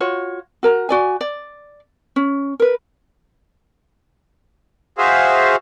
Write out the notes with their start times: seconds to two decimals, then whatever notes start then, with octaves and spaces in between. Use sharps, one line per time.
0.01 F4 F#4 C#5
0.63 F#4 A#4 A#5
0.89 F#4 D5 G#5
1.21 D5
2.16 C#4
2.60 A#4 B4
4.98 F#4 G#4 C5 E5 F5